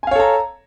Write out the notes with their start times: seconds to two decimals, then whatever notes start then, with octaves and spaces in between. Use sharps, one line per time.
0.03 G#5
0.07 F5
0.11 C#5
0.16 A4
0.20 A#5